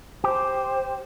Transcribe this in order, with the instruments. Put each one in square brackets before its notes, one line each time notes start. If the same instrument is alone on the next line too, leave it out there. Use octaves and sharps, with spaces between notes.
[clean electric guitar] G4 [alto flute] C5